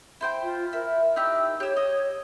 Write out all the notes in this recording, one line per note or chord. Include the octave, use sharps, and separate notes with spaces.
E4 C5 G5
F4
E4 A#4
D#4 E4 G4 E6
G4 C#5 E6
D#5